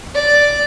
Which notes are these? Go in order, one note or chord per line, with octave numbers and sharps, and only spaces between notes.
D5